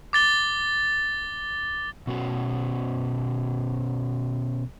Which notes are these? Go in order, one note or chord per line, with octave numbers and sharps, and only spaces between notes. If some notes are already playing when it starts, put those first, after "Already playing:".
D6 A6 G7
B2 C#4 F#4